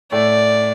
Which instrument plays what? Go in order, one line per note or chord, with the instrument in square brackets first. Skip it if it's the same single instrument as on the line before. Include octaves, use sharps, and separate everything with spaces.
[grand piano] A2 A3 [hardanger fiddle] D5